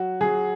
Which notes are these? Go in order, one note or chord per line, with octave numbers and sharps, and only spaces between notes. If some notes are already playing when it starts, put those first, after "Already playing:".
Already playing: F#3 F#4
F#3 G#4